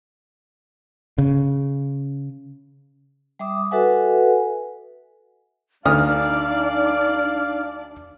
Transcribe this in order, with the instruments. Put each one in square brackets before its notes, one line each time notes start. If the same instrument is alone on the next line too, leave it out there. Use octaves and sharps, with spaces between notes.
[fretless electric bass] C#3
[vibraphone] G3 E5 D6 D#6
F#4 A4 B4 E5 F#5 G#5
[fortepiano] D2 D#6 F6 [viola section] D4 D5 [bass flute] D#4 [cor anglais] F5